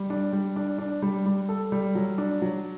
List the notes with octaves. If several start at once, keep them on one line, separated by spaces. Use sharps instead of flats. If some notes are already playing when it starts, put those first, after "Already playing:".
Already playing: G3
D4
G3
D4
D4
G3
G3
A4
G3
F#3
D4
F#3